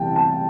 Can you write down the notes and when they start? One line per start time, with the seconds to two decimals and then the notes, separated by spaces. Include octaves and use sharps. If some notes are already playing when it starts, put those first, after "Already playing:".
Already playing: C2 C3 E3 G5 A5
0.16 A5